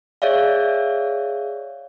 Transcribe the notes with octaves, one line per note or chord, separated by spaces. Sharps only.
G#4 C#5 D5 E5 F5